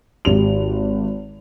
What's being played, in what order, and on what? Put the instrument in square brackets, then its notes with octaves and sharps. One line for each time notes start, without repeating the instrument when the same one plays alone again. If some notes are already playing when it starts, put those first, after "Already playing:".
[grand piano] G#1 G4 F7